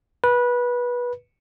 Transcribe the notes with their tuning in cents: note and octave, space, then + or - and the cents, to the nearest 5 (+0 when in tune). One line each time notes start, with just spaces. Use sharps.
B4 -20